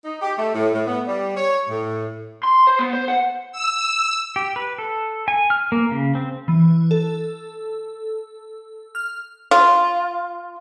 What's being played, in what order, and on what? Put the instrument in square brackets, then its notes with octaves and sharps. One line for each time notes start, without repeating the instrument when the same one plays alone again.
[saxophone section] D#4
G4
A3
A2
A2
B3
G3
C#5
A2
[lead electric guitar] C6
C5
B3
C5
F#5
[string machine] E6
[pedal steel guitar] G4
B4
A4
G#5
F6
A#3
C#3
C4
[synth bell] E3
A4
F6
[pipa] F4